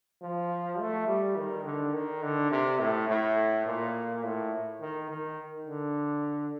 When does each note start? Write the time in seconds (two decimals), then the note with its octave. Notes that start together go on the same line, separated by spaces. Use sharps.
0.22 F3
0.79 A3
1.07 G3
1.36 D#3
1.65 D3
1.94 D#3
2.23 D3
2.51 C3
2.80 A2
3.08 A2
3.66 A#2
4.23 A2
4.81 D#3
5.10 D#3
5.67 D3